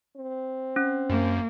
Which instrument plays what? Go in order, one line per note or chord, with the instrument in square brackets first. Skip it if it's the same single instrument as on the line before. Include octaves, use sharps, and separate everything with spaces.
[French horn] C4
[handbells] C#4
[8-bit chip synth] F#2 [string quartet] A#3